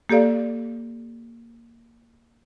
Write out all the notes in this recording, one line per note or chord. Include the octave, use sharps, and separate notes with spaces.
A#3 G4 A4 D5 F5